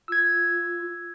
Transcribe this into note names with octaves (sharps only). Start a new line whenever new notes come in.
F4 E6 G#6